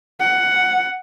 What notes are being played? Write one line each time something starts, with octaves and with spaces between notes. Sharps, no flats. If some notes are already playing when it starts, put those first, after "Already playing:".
F#5